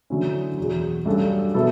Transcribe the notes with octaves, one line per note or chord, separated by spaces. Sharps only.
D3 F#3 C#4 E4
E2 B2 F#3
G2 F#3 C#4 F#4 A4
B2 F#3 B3 E4 A4